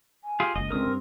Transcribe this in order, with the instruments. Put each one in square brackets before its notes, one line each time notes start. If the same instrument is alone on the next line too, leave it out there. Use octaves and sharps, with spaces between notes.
[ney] G#5
[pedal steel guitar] F4 G4 G#4
[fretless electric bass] F#1 C#2 [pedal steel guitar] D#5
[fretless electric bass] C#2 D3 [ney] C4 [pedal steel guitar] A#4 D#6
[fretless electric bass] G2